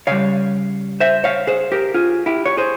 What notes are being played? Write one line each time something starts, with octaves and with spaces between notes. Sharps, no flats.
C#3 G3 C#5 F5
C5 E5
C#5 F5
G#4 C5
G4 A#4
F4 G#4
E4 G4
C#5
G#4 C5